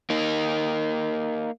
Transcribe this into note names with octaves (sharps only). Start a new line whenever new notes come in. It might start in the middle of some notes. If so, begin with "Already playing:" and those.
A#3 D#4